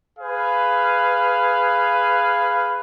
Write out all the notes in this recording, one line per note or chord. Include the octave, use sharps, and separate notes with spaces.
G#4 B4 F5